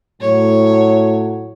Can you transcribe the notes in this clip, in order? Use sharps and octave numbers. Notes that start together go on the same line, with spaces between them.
A2 F#3 C#5